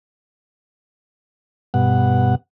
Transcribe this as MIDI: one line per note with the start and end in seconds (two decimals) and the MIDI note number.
1.74 2.35 43
1.74 2.35 47
1.74 2.35 78